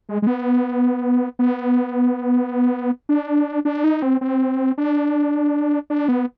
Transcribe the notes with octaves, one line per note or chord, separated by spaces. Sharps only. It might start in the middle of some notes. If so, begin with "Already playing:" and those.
G#3
G#3
B3
B3
D4
D4
D#4
C4
C4
D4
D4
B3